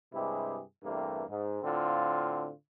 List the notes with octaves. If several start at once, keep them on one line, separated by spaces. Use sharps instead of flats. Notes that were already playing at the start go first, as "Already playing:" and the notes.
G2 C3 G#3 E4 G4 G#4
E2 G2 C3 A3 A#3 D4
G#2
A2 D3 C4 F4